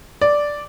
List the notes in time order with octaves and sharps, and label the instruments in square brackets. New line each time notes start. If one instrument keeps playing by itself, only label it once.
[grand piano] D5